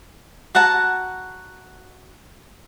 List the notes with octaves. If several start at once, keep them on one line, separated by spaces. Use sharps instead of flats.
F#4 F#5 A5 A#5